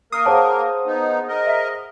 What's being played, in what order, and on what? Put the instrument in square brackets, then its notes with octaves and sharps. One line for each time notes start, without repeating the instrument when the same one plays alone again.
[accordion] A#3 A#4 [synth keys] D#6 [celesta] F6 C7
[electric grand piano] G#4 C5 F#5 [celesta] C#5 F5 A5
[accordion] B3 D#4
A#4 D#5
[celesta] E5 B6